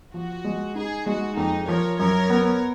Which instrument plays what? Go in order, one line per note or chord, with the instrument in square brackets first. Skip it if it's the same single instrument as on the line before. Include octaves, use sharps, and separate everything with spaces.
[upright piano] F3 [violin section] F#4
[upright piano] G#3
[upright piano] D#4 [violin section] G#4
[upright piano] G#3 [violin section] F#4
[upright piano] F2 [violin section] D#4
[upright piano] F3 [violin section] A#4 C#5
[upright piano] F#2 [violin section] A#4 C#5
[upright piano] B3